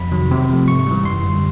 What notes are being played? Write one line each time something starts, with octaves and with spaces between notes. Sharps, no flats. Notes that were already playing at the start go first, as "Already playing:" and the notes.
Already playing: F2 B5
C3 D#3 F#3
C3
F3 A3
G#2 C#6
E3 G3
F#2 C6
D3 G3